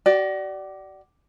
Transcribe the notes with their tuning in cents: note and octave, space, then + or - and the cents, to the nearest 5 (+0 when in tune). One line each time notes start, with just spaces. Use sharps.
F#4 +40 D5 +0